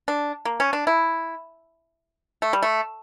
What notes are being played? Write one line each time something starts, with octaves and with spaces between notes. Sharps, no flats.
D4
A#3
C#4
D4
E4
A3
G3
A3